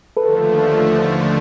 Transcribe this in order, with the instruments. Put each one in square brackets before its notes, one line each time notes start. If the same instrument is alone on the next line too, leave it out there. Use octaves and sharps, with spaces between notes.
[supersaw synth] D#2 D3 F3 A3 [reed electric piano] A4 B4